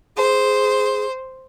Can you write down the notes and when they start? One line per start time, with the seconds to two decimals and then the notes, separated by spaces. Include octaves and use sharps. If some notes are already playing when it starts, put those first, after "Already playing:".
0.17 G#4 C5